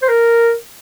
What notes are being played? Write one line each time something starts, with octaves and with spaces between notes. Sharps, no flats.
C5
A#4